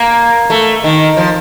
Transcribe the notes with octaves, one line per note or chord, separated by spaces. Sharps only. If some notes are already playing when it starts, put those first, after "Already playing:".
Already playing: A#3
A3
D#3
F3